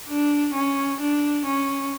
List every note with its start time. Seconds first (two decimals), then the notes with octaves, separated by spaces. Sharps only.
0.08 D4
0.54 C#4
1.00 D4
1.45 C#4